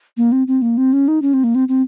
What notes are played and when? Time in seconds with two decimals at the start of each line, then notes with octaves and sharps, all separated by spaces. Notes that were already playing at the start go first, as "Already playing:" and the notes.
0.17 A#3
0.32 C4
0.47 C4
0.62 A#3
0.77 C4
0.93 C#4
1.08 D#4
1.22 C#4
1.34 C4
1.44 A#3
1.55 C4
1.68 C4